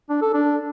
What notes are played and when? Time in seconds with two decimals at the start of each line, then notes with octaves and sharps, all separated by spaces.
0.10 D4
0.22 A4
0.34 D4